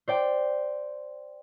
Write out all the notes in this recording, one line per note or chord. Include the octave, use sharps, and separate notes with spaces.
C5 D5 G5